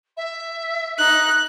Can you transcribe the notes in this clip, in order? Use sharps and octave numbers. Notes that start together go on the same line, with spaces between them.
E5
D#4 F#6